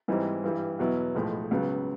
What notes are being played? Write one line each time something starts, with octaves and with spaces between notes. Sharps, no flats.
G#2 E3 G3 C4 D#4
G2 E3 G3
E2 B2 F#3 B3 E4
B1 A2 F3 G#3
C#2 C#3 F#3 B3